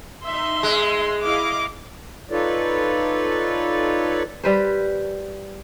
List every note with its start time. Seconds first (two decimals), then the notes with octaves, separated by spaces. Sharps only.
0.24 D#4 E5 C6
0.63 G#3
1.22 E4 D#5 F5 D6
2.31 D#4 F4 A4 B4 C#5 D5
4.44 G3 B4 C5